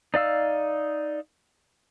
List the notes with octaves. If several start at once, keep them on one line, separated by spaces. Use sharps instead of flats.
D#4 D5 F5 E6